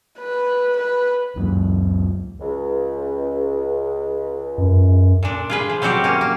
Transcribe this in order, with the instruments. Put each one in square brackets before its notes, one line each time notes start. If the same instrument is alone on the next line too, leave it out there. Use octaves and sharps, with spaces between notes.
[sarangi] B4
B4
[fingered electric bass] C#2 F#2 F#3
[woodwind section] C#2
[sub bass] F#2
[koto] A#2 D4
F4 G#4 B4
F3
F#3 G3 C4 F#4 G4
A#3 C#4
A#3